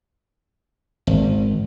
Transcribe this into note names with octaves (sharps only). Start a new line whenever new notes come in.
G#1